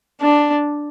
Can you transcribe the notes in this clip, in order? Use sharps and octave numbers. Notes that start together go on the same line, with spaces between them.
D4